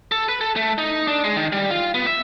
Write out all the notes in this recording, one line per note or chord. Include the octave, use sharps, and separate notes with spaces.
A4
B4
A4
A3
D#4
D4
G#3
D#3
G3
F4
B3
E5